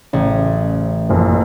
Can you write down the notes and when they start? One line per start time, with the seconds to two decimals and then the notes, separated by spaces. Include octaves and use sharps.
0.13 A1 C#3
1.09 F#1 F2